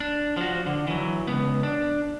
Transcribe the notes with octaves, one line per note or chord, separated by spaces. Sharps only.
D4
F3 F#4
D3
E3 F#3
C#2 B3
D4